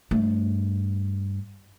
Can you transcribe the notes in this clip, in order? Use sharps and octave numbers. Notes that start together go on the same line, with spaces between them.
G2 A3